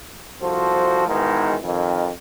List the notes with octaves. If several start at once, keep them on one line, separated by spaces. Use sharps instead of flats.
C2 F3 F#4 A4 C5
G#2 B2 D#3 E3 G#3
F2 D#3